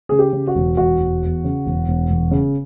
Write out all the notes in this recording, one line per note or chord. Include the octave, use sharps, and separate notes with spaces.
C#3 G#4
G4
C#3
F#4
E1
E1 F#4
E1
E2
C#3
E1
E1
E1
C#3